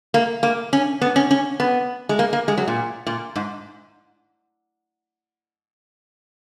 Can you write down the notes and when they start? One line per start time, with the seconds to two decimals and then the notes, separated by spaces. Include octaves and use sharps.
0.14 A#3
0.43 A#3
0.73 C#4
1.01 B3
1.16 C#4
1.31 C#4
1.60 B3
2.09 G#3
2.19 A#3
2.33 A#3
2.48 G#3
2.58 F#3
2.68 A#2
3.07 A#2
3.36 G#2